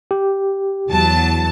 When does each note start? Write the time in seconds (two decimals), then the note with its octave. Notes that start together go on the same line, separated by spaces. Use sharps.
0.11 G4
0.88 E2 F#3 A5